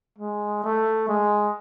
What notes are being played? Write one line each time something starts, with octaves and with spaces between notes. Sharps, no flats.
G#3
A3
G#3